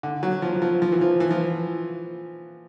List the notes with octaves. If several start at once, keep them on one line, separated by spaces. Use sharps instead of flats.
D3
F#3
F3
F3
F3
E3
F3
E3
F3